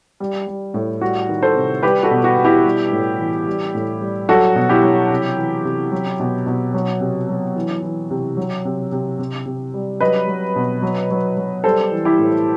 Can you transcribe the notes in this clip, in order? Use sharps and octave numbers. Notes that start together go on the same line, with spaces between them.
G3
G3
A2
G3 F#4
D#3
A4 C5
C3
G3 G4 B4
F#4 A4
B2
F#4
B2
E4 G4
G3
A2
E3
G3
A2
G3
F#3 F#4 A4
B2
E4 G4
F#3
C3
E3
C3
F#3
B2
B2
F#3
C3
F#3
E3
E3
C3
F#3
C3
C3
C3
C3
G3
F#3 B4 D#5
F#3
B2
F#3
F#3
F#3
G3 A4 C5
E3
E4 G4
A2